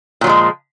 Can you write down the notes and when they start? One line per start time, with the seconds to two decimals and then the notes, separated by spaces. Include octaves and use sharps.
0.21 A#2
0.24 F#3
0.27 F3
0.29 G#3